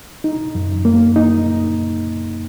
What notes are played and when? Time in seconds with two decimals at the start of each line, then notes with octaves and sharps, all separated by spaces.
0.24 D#4
0.55 F#2
0.85 A#3
1.16 D#4